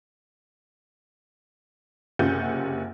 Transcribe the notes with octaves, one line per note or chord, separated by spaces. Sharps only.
F#1 C3 C#4 F4 F#5 G6